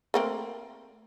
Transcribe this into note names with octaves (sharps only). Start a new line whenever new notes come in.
A3 A#3 C4